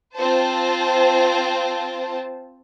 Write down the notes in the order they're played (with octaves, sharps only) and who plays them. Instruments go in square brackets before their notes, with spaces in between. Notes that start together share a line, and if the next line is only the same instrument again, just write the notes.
[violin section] C4 F4 C5 A5